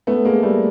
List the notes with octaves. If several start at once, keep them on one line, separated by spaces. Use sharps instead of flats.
A3 B3
G#3 A#3
G3 A3